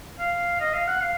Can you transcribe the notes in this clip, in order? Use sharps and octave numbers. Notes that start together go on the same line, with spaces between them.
F5
D#5
F5
F#5
F5